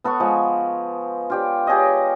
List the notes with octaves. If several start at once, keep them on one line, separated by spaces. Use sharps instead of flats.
B3 A4 F#5 C#6
F3 G#3
F4 G4 D5
G4 G#4 C#5 D#5